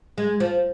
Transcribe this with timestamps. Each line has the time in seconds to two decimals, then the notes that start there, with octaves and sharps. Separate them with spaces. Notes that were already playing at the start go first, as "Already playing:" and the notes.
0.18 G#3
0.40 F3